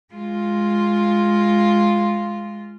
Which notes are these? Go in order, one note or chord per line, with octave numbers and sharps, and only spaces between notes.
G#3 F4